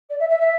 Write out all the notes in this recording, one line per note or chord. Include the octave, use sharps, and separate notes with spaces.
D5
E5
E5
E5